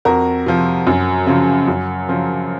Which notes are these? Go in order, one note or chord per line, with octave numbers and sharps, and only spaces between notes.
F2 F#4 A#4
C3 F3
F#2
C#3 F3
F#2
C#3 F3